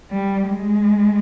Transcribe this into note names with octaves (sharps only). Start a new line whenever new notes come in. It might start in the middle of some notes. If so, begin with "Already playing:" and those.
G3
G#3